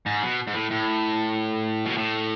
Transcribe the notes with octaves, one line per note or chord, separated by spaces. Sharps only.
G#2
B2
G#2
A2
A2
B2
A2